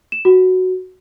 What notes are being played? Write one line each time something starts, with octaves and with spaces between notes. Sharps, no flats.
E7
F#4